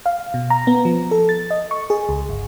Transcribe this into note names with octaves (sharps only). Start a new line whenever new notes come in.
F5
B2
A#5
B3
F3
A4
A6
D#5
C#6
G#4
C#2
G1